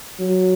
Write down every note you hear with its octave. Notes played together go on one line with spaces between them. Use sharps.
F#3